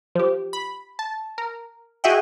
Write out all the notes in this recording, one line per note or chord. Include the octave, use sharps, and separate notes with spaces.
F3 G4
B5
A5
A#4
F#4 G#4 D#5 E5 F#5 G5